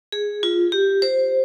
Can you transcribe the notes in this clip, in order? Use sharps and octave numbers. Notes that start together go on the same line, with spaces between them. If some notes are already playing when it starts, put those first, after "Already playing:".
G#4
F4
G4
C5